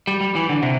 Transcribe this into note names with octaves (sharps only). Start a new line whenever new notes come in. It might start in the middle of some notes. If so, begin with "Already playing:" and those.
G3
G3
E3
D3
C3